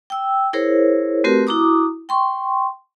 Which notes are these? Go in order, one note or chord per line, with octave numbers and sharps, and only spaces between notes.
G5 E6
E4 G#4 A#4 C5 C#5
A3 C4 F#4 G4 A#4 B4
E4 F#4 A#5 D6 D#6
G5 C6 C#6